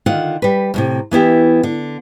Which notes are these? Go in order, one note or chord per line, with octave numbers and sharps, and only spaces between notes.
D3 D#3 F4 F#5
G3 B4
D2 A2 C3
E3 B3 E4 G4
D3